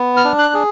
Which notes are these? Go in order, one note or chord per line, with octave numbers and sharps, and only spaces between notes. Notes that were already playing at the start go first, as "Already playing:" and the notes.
Already playing: B3
F6
D4
F#6
G#4